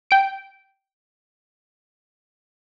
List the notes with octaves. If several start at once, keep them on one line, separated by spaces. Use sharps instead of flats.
G5 D7